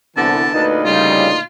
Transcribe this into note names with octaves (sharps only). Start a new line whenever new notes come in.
C2 D3 E3 B3 A5
D2 A#2 D#4 B4
C#3 G3 F4